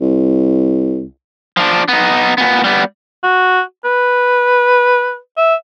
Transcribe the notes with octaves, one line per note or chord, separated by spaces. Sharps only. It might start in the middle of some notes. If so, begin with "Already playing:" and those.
C2
F3 D4
B3 D#4
A#2 B3
G3 B3
F#4
B4
E5